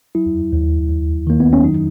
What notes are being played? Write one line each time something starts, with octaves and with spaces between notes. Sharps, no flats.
F#3 E4
D#2
D#2
D#3 A#3
B3
C#4
F#3 D#4